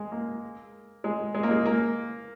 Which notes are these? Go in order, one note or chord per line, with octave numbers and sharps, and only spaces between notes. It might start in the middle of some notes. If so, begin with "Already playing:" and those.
Already playing: G#3
A#3
G#3
G#3
A#3
G#3
A#3